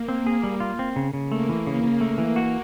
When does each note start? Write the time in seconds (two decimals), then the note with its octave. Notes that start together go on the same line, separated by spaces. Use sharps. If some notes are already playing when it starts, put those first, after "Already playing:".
Already playing: A#3
0.09 C4
0.27 G#4
0.43 G3
0.60 F4
0.79 C4
0.96 C#3
1.14 C#3
1.31 A3 A#3
1.49 E3
1.66 C#3 A#3
1.83 C#3
2.01 A3
2.18 E3
2.36 F#4